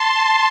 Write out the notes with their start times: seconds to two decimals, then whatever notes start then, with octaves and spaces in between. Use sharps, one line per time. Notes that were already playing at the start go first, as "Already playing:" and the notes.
Already playing: A5 C6